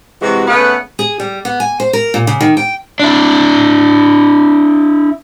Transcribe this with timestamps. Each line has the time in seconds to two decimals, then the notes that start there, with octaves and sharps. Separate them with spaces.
0.22 C3 E3 G#3 F#4
0.48 C#3 A3 B3 B4 F#5
0.99 G#4
1.20 G3
1.45 B3
1.60 G#5
1.80 C5
1.93 A#4
2.14 A#2
2.27 C#3
2.41 D#3
2.57 G5
3.00 D4 E4